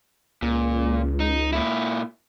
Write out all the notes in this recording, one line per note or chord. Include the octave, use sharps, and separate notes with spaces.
C#2 A#2
D#4
A#2 E4